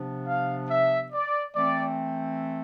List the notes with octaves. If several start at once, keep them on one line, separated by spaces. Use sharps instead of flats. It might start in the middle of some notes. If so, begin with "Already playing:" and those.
Already playing: C3 F3 B3 D4
F5
E5
D5
E3 A3 C4 D5